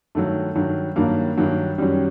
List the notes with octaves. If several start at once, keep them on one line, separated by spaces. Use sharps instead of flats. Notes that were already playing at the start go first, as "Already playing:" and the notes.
G2 D#3 F#3 A3
G2 D#3 F#3
G2 D#3 F#3 A#3
G2 D#3 F#3
F#2 D#3 F#3 G3